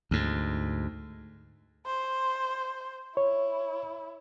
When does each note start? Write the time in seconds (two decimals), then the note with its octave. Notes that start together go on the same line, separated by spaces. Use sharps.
0.11 D2 G#2
1.87 C5
3.17 E4 C#5